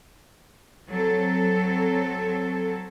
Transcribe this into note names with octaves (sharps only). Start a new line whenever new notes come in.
F#3 C4 A4